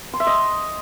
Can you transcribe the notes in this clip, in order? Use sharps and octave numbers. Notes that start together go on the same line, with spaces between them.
C6
E5
D#5